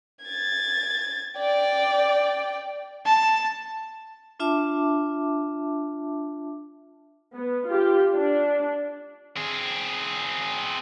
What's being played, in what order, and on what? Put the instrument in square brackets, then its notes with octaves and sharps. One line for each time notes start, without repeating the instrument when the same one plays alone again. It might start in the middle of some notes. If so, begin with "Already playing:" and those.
[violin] G#6 A6
D5 G5
[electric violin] A5
[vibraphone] D4 F4 E5 A5 D6
[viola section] B3
F4 G4
D4
[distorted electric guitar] C4 G#4